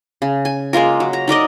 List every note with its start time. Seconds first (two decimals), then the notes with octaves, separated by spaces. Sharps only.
0.22 C#3
0.45 G#5
0.73 G#3 A#3 F4 A#4
1.00 F#3
1.13 A#5
1.28 D#4 A#4 D5 D#5